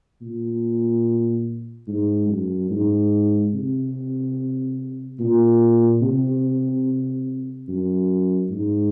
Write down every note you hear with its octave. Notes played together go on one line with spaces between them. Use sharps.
A#2
G#2
F#2
G#2
C3
A#2
C3
F#2
G#2